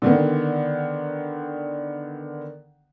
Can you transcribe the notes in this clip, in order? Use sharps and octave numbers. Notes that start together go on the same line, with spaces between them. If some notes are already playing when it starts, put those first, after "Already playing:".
D3 D#3 B3